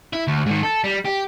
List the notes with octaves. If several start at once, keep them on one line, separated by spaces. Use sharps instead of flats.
E4
D2
G#2 D#3
A4
G3
G4